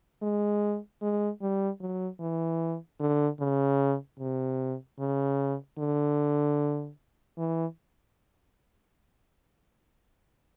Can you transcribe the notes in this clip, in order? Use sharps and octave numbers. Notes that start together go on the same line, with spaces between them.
G#3
G#3
G3
F#3
E3
D3
C#3
C3
C#3
D3
E3